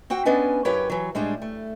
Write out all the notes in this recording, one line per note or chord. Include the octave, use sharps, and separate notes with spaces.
C4 F#4 F#5 G5
B3 C#4 D4 B4 D#5 G#5
F#2 E4 G4 B4 C#5 G5
E3 F#3
A2 G3 G#3 D4
A3